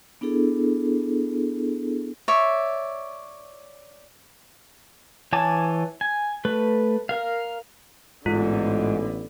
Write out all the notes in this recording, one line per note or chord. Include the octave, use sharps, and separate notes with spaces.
B3 D4 E4 G#4 A4
C#5 D5 E5
E3 C#5 G#5 A5 D6
G#5
A3 B4
A#4 F5
A1 G#2 D3 B3 F4